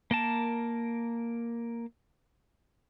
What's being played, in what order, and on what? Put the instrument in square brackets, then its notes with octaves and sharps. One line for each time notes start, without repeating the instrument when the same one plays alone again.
[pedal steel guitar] A#3 A#4 A5